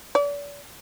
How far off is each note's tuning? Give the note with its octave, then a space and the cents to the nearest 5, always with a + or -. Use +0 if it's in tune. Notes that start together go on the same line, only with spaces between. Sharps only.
D5 -40